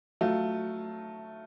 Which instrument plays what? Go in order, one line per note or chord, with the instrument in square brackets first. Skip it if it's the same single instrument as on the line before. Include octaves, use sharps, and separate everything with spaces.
[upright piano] F#3 A3 F4